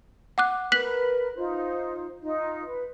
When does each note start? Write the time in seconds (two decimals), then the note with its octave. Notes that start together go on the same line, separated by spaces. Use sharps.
0.38 F#5 D6 F#6
0.72 A#4 B4 F#6 B6 F#7
1.36 D#4 F4 C5
2.23 D#4 F4
2.64 B4